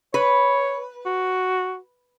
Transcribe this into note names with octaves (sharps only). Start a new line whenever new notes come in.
B4 C#5
F#4